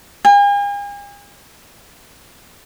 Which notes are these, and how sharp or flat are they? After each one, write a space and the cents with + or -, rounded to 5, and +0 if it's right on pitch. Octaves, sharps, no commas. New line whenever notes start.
G#5 -45